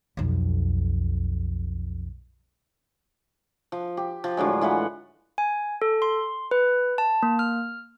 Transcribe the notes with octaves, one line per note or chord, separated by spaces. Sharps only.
B1 F2
F3
G4
F3
A2 D3 F#3 G#3
E3 F4 B4 F#5
G#5
A4
C6
B4
A5
A#3
F6